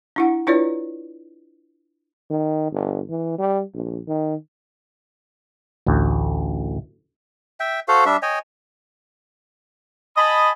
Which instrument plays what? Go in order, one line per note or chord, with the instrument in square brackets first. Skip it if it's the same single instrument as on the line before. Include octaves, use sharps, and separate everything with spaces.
[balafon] D4 E4 F#5
D4 E4 F4 B4 C#5 D5
[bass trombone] D#3
G1
E3
G3
A#1
D#3
[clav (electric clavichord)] A1 D2
[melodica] E5 G5
F#4 A4 C5 F5
G3 D4 E5
C#5 D#5 G5 G#5
[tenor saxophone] D#5 [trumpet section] G#5 A5 B5 [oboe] D#6